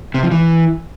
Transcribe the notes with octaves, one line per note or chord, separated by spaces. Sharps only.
C3
F3
E3